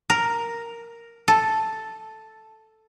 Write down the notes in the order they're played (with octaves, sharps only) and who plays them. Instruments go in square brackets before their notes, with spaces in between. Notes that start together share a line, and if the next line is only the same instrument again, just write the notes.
[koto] A#4
A4